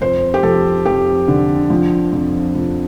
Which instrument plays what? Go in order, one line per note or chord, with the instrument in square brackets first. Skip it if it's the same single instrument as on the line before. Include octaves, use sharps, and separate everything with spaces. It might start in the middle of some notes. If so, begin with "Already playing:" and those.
[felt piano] F2 C5
G4
F3 A4
F2 G4
D3
F3
F2
F2